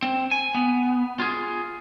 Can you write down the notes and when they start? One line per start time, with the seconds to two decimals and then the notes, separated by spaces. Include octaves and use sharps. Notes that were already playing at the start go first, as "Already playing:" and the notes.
0.03 C4
0.31 G#5
0.55 B3
1.20 F4 G#4